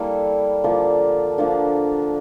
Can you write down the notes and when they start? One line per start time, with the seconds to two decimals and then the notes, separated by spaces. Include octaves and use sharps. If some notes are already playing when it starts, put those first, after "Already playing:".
Already playing: G3 A#3 E4 A4
0.64 D3 F3 A#3 D4
1.38 D3 F3 A#3 D4